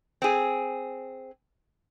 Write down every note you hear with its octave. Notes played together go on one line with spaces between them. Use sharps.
C4 G#4